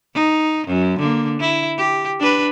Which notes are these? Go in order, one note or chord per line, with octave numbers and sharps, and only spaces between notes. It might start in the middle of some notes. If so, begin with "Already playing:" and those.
D#4
F#2
D3 A#3
E4
G4
D4 B4